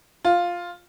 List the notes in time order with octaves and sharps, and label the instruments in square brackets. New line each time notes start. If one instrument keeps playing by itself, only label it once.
[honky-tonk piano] F4